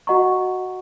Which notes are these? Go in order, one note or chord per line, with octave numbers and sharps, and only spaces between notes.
F#4 D#5 F#5 A#5 C#6